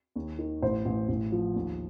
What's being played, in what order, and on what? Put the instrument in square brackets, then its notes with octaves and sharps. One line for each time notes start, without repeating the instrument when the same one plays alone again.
[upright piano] D#2
D#3
A1 C5
A1
A1
F3
D#2